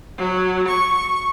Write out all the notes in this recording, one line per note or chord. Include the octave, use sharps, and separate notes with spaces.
F#3
C#6